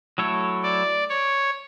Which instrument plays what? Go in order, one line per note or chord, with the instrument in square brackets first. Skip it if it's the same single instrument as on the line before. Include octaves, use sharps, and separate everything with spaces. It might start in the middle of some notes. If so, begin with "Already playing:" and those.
[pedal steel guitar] F#3 A3 E4 A4 C#5
[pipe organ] D5
C#5